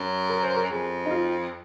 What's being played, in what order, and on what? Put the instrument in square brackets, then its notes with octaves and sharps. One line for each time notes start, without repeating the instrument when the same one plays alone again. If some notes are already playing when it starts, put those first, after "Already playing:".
Already playing: [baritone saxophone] F#2
[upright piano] A#4
C5
A#4
[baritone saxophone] F2 [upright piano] G#4
[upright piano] D#4
F4